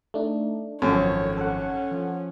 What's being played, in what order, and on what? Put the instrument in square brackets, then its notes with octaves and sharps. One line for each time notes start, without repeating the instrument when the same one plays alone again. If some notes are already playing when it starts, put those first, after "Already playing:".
[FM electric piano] A3 D4 D#4
[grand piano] G#1 F3 C#6 [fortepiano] F#2 [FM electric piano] A4 [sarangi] C#5
[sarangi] C#4 [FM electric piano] A4 F#5
[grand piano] F3